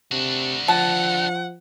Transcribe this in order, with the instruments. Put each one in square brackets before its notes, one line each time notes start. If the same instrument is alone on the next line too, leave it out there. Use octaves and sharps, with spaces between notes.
[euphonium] C3 [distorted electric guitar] D4 F#4
[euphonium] F3 [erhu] F#5 [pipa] A5